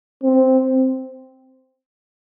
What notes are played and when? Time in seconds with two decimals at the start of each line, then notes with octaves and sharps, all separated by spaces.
0.23 C4